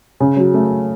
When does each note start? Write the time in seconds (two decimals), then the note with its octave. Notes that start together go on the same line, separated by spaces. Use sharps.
0.20 C#3
0.37 F#3
0.54 A3